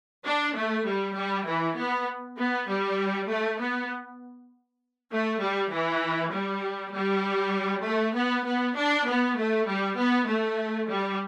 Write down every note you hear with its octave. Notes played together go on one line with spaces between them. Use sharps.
D4
A3
G3
G3
E3
B3
B3
G3
A3
B3
A3
G3
E3
G3
G3
A3
B3
B3
D4
B3
A3
G3
B3
A3
G3